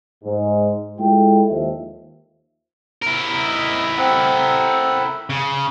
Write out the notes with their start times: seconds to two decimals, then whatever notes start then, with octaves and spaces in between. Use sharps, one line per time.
0.24 G#2
0.99 G#3 E4 F4 A4 G5
1.49 D#2 F3 E5
3.02 E4 A#4
3.45 D#4
3.98 C4 A4 F#5
5.30 C#3